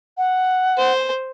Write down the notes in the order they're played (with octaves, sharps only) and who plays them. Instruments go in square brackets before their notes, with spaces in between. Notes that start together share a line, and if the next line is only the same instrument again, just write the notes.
[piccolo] F#5
[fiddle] C5